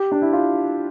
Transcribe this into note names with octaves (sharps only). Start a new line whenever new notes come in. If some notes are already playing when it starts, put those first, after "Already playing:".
Already playing: G4
D4
E4
F4